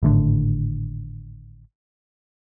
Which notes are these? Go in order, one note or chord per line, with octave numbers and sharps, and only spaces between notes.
G#1 A2 D3